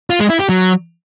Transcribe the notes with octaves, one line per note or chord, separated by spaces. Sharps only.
F4
G#3
E4
G4
F#3